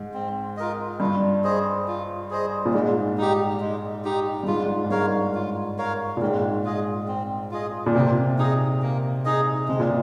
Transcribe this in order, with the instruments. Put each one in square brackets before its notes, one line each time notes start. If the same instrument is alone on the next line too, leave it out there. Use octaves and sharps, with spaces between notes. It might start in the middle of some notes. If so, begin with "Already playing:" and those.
Already playing: [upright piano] G#2
[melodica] C4
F4 A#4 D#5
[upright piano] G2 [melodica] F4
[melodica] G#4 C5 D#5
F4
G#4 C5 D#5
[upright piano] A#2
[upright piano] G#2 [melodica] G#3
[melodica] D#4 G4
G#3
D#4 G4
[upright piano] G2
[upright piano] G#2 [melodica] F4
[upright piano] G#2
[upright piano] G2 [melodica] A#4 C#5 F5
[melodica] F4
A#4 C#5 F5
[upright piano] A#2
[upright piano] G#2 [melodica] C4
[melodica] F4 G#4 D#5
C4
F4 G#4 D#5
[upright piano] A#2
[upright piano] C3 [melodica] A#3
[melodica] D#4 G#4 D#5
A#3
D#4 G#4 D#5
[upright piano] C3 [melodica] G#3
[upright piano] A#2